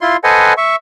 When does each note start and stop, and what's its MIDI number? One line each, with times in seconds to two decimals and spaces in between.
0.01 0.17 64
0.01 0.17 65
0.01 0.17 84
0.24 0.53 69
0.24 0.53 71
0.24 0.53 72
0.24 0.53 75
0.24 0.53 78
0.24 0.53 80
0.57 0.76 76
0.57 0.76 85